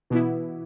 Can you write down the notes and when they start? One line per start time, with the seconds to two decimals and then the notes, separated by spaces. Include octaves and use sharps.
0.10 B2 E3 B3 E4